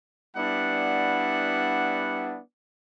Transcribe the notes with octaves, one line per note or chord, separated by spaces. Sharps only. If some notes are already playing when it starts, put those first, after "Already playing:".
G3 B3 D4 E4 D5 F#5